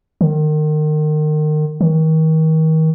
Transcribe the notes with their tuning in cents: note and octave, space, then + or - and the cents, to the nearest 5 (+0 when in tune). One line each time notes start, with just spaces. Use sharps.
D#3 -30
D#3 +35